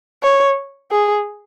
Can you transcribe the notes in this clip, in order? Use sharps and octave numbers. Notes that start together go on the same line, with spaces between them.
C#5
G#4